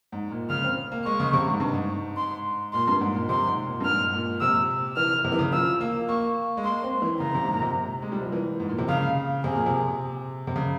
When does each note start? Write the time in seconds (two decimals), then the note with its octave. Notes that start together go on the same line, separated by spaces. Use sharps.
0.12 G#2
0.31 A#2
0.50 C#3 F6
0.64 C4
0.92 A#3
1.05 G#3 C#6
1.20 C#3
1.33 C3
1.48 G#2
1.60 G2
1.73 G#2
2.17 C6
2.73 A#2 C6
2.87 G2
3.01 G#2
3.15 A#2
3.29 C3 C6
3.47 G#2
3.66 A#2
3.80 G2
3.85 G#2 F6
4.09 G#2
4.14 A#2
4.41 C3 E6
4.96 E3 F6
5.25 C3
5.32 E3
5.39 C#3
5.52 F3 E6
5.81 A#3
6.09 A#3 C#6
6.57 G#3
6.64 A#3 C6
6.84 C4
7.02 E3
7.20 C#3 A#5
7.35 C3
7.44 G#2
7.53 A#2
7.62 C3
8.02 G#3
8.12 G3
8.22 F3
8.32 E3
8.60 G#2
8.69 A#2
8.79 C3
8.89 C#3 F5
9.44 C3 G#4
9.55 A#2
9.66 C3
10.47 C3
10.56 C#3